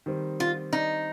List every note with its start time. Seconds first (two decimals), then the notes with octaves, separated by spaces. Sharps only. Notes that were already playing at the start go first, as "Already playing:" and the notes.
0.06 D#3 G3 C4
0.40 F4
0.73 D#4